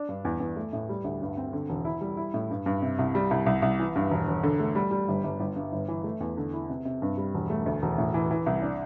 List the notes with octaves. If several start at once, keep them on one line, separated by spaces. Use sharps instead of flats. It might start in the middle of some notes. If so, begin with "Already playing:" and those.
Already playing: D4
G2
E2
E2
A3
A2
G3
D2
G2
C4
D3
E1
E4
G3
E4
A2
G2
G2
C3
C2
G3
C2
C2
C2
E3
G2
E1
E1
D3
A3
G3
G3
G1
G1
G1
G2
G1
E3
A3
E2
D3
E4
C3
C3
G2
G3
E1
A3
D2
E1
A2
E3
E3
C2
D4